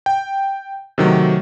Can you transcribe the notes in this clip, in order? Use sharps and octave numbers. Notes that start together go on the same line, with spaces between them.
G5
C3 D#3 F#3 A3